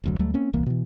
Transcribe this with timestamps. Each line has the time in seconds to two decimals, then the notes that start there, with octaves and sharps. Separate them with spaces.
0.04 F1 D2 F#3
0.19 D2 F#3 G3 A3
0.34 A#3 C4 C#4
0.53 D#1 C2 E3 A#3
0.66 B2 E3